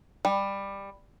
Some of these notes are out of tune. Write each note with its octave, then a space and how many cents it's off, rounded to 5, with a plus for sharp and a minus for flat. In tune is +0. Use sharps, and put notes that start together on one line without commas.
G3 +15